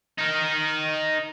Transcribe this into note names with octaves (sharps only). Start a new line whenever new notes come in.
D#4 A#4